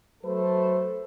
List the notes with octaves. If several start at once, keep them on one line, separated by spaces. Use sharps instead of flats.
F#3 A3 A4 B4 C5